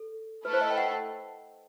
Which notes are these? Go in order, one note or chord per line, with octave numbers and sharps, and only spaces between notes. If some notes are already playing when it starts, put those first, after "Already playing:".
Already playing: A4
A3 E4 A4 B4
C5
D#5
G5
F#5